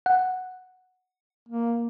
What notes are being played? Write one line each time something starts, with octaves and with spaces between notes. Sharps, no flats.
F#5
A#3